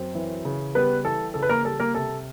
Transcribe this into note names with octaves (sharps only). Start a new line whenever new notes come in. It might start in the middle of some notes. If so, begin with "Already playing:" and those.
Already playing: F#2 C4
E3
C#3
G3 B3 B4
E3 A4
C#3 A4
B4
A#3 A#4
G3 A4
A#3 A#4
C3 A4